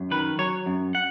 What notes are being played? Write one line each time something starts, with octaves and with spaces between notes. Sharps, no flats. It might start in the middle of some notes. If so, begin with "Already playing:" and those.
Already playing: F#2
D#3 B4
F#3 C#5
F#2
F#5